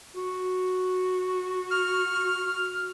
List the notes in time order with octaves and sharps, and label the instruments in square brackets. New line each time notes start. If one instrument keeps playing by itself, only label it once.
[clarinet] F#4
[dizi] F6